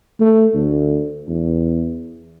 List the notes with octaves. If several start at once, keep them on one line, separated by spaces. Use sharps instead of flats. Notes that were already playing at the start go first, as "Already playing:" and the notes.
A3
D2
E2